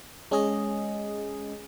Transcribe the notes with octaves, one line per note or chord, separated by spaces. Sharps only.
G#3 C#4 G#4 D#5